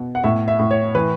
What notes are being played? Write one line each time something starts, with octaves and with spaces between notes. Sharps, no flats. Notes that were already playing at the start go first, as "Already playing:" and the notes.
Already playing: B2 F#5
F#5
A2 E5
E5
A2
C#5
E3 B4